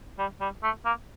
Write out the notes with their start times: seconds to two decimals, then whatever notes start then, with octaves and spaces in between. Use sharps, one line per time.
0.19 G3
0.41 G3
0.63 A3
0.86 A#3